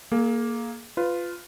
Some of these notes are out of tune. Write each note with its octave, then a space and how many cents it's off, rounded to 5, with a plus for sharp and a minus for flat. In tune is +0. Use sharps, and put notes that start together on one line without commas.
A#3 +0 G#4 +35
F4 +0 B4 +20